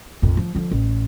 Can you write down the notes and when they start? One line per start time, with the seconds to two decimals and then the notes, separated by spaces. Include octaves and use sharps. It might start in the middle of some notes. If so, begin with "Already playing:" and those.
0.22 A#1 F2
0.37 F3
0.55 D3 F3
0.71 A1